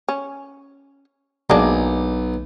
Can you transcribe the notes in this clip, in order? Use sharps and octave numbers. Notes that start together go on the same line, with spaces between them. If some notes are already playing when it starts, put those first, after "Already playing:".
C#4
B1 G#3 A#3 D4